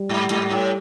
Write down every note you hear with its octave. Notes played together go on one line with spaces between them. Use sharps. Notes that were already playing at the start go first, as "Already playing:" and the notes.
Already playing: G3
G#2
G#2
A2